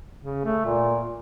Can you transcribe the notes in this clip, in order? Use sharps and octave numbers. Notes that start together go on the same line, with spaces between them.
C#3
A3
A#2